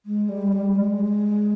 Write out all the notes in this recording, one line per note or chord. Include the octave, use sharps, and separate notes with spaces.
G#3
G3
G#3
G3
G3
G#3